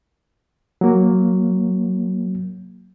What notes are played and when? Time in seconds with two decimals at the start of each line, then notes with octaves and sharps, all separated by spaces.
0.81 F#3 A#3